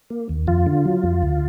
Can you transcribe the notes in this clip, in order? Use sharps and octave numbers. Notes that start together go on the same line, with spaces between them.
A#3
D#2
F2 F4
D3
F#3
F2
D2